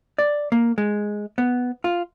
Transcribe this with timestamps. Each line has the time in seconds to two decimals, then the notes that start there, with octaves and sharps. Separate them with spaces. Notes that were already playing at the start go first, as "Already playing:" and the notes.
0.18 D5
0.52 A#3
0.78 G#3
1.38 B3
1.84 F4